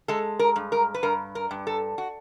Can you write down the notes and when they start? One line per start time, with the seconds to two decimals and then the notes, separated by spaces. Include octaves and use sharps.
0.08 G#3 A4
0.39 A#4
0.56 G2
0.72 A#4
0.94 B4
1.03 G2 A#4
1.35 A#4
1.51 G2
1.67 A4
1.98 F#4